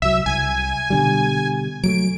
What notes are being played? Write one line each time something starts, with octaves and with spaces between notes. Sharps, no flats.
C2 F#3 E5
C2 G#5
B2 D3 G3
F#3 G3 A3 D7